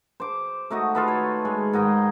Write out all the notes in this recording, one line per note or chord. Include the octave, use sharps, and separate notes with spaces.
C5 D6
A3 D#4 F#4 D#5
F4 A4 B4
C#5
G#3 C#5
G#2 D#3 D#5 G5